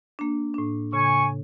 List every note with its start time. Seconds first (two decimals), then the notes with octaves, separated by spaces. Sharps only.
0.19 A#3 D4
0.54 A2 D4
0.93 A2 C#3 G#5 C#6